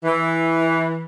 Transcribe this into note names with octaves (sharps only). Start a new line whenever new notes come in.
E3